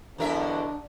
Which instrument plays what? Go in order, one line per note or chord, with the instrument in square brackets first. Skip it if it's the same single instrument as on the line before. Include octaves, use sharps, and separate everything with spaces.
[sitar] E2 A#4 E5 [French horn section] G2 B2 D3 [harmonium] D4